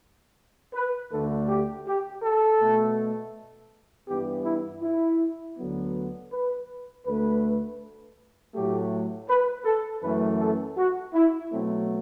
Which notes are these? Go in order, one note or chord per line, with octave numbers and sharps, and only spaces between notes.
B4
D2 D3 A3 A4
G4
G4
A4
B2 A3
G2 E3 B3 G4
E4
E4
D2 D3 F#3 B3
B4
D2 D3 A3 B4
A2 F#3 A3 G4
B4
A4
F#2 E3 A3 B4
A4
F#4
E4
B2 F#3 A3 C4